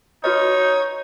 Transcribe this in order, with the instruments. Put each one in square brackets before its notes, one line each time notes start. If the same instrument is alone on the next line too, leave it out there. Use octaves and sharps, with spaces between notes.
[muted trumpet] D#4 [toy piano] F#4 B4 D#5 [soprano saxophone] C#5